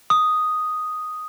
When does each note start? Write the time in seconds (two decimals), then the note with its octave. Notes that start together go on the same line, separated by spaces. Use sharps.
0.10 D#6